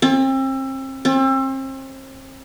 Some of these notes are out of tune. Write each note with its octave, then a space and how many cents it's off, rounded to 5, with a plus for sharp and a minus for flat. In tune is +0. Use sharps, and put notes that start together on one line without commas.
C4 +35
C4 +35